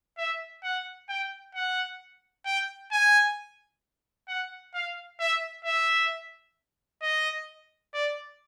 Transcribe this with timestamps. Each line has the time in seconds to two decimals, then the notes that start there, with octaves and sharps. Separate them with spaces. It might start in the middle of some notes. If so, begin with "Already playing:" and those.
0.18 E5
0.63 F#5
1.09 G5
1.55 F#5
2.46 G5
2.92 G#5
4.28 F#5
4.74 F5
5.20 E5
5.65 E5
7.02 D#5
7.94 D5